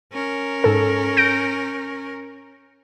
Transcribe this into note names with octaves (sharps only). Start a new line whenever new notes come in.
C#4 A#4
G#2 A4
G6 A#6 D7